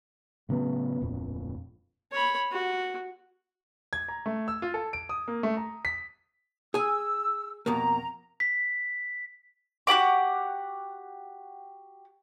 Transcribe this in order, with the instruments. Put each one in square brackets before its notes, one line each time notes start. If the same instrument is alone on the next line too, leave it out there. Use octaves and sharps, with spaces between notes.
[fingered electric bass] A2 C#3 F#3 B3
D1 F2 A#2
[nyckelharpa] C#5 B5
F#4
[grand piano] G#6
A#5
A3
E6
F4
A4
D7
D#6
A#3
A3
A#5
B6
[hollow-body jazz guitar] G#4 G#5 [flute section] E6
[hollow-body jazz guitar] F2 B2 A#3 [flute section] A#5
[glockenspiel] B6
[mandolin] F#4 G4 F#5 D6